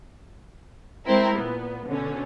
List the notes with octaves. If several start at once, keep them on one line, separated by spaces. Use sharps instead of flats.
G#3 C4 E4 A#4
A#2 B3
B2 D3 C#4